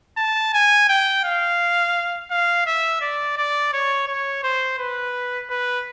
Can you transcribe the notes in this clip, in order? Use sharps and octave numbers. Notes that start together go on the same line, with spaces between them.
A5
G#5
G5
F5
F5
E5
D5
D5
C#5
C#5
C5
B4
B4